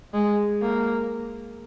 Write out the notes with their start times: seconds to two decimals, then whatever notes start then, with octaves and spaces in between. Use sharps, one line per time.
0.14 G#3
0.62 A#3